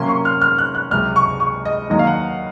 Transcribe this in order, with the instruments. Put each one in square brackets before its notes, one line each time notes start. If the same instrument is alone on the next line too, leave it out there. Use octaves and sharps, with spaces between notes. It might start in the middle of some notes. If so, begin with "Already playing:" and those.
Already playing: [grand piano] C3 F#3 A#3 C#4 C6
C#6
F6
F6
F#6
F#6
C#2 C3 F#3 F6
C#6
C#6
D#5
D#2 D#3 F#3 D#5
F5
F#5